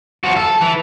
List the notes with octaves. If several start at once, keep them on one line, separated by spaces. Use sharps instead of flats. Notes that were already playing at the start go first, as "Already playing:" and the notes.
F3 F#4
A4
E3